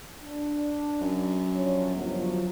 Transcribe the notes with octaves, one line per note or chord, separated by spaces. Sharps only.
D4
F#2
F3 D4 C#5
G1 F3 F#3